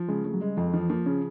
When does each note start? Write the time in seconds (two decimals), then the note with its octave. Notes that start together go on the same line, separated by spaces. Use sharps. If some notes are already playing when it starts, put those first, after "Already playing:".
Already playing: F3
0.09 C#3 G#3
0.25 C#3 A3
0.34 F#3
0.41 G3 G#3
0.57 F2 F3
0.73 E3 F3
0.89 F3 A#3
1.06 C#3 C#4